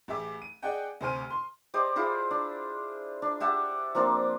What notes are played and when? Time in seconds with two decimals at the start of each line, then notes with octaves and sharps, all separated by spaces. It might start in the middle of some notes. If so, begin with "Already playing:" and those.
0.08 A1 G4 G#4 E5 D6
0.42 D#7
0.62 G#4 D5 D#5 F#5 G5
1.01 D2 C3 C5 G#5 F6 D#7
1.30 C6
1.74 G4 C5 D5 D#5
1.96 E4 F4 G#4 C5
2.31 D4
3.22 D4
3.40 G4 E5 F#5 A5
3.95 F3 A#3 C4 D4